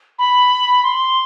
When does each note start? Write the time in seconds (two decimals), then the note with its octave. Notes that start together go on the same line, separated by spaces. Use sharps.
0.19 B5
0.83 C6